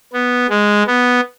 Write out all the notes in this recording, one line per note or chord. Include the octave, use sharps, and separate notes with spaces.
B3
G#3
B3